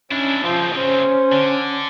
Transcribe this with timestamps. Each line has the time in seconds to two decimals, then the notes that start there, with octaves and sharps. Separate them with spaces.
0.11 C#4 D4 E4
0.45 C#3 F3 C4
0.76 C#4 C5
1.32 D3